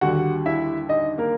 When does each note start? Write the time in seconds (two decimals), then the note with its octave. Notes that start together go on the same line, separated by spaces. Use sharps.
0.01 D#2 D3 G3 F#4 F#5
0.45 E4 E5
0.89 D#4 D#5
1.18 A#3 A#4